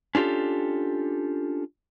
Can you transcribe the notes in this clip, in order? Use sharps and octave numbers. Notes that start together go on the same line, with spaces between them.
C#4 D4 F4 G4 A4